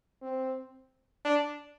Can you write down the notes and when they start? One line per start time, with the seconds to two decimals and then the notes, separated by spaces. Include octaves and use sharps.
0.22 C4
1.25 D4